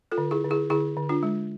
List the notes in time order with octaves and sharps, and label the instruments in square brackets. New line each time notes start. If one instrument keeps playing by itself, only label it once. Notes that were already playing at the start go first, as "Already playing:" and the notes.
[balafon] F4 A4
D3
E4 G#4
D3
E4 G#4
D3 E4 G#4
D3
D4 F4
G#3